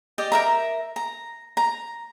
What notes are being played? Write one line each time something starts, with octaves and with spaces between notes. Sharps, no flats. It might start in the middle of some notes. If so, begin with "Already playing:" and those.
G4 D5 D#5
A#4 E5 A#5
A#5
A#5